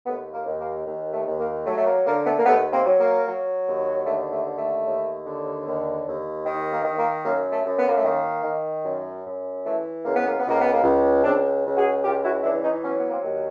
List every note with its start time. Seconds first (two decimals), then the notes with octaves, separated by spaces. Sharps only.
0.06 D#2 A3 B3
0.33 A#3
0.46 D#2
0.60 A#3
0.86 D#2
1.13 A3
1.27 D#2
1.39 A#3
1.66 F#3 A3
1.78 A3
1.86 A#3
2.06 D3 A#3
2.26 A3 B3
2.38 A#3
2.45 D#2 A3 B3
2.73 A#3 C4
2.86 F#3
2.99 A#3
3.26 F#3
3.66 D#2
4.06 D3 A3
4.32 A3
4.45 D#2
4.58 A3
4.85 D#2
5.26 D3
5.65 D#2
6.06 D#2
6.45 D#3
6.72 A#3
6.85 D#3
6.98 A#3
7.24 F#2 A#3
7.52 A3
7.64 F#2
7.79 B3
7.87 A#3
7.97 A3
8.04 D#3 A#3
8.44 D#3
8.84 F#2
9.25 F#2
9.65 E3 A3
10.04 C#2 A#3
10.16 B3
10.28 A#3
10.39 B3
10.45 C#2
10.50 A#3
10.61 B3
10.73 A#3
10.84 C#2
11.24 C#2 C4 D4
11.65 C#2
11.77 F#4 G#4
12.04 C#2 F4 G4
12.25 E4 F#4
12.43 E3 D4 E4
12.63 C#4 D#4
12.84 F#3 B3 C#4
13.00 B3
13.10 A#3 C4
13.24 D#2